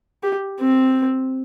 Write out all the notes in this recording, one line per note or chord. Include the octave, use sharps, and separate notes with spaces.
G4
C4